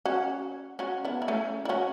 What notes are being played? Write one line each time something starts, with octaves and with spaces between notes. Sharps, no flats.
C#4 F#4
C#4 F#4
B3 E4
E4
A3 C#4
E4
C#4 F#4